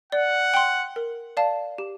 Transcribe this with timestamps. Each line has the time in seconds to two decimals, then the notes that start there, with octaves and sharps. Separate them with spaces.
0.12 D5 F#5
0.54 G5 C6
0.96 A#4
1.37 D5 F5 A5
1.78 G4